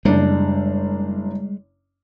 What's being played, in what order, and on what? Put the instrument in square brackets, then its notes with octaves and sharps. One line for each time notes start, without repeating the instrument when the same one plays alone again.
[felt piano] F#1 D4 [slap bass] G3 G#3